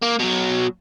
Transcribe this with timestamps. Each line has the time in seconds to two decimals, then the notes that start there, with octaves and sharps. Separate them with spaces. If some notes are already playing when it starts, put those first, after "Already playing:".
0.02 A#3
0.19 B2 F#3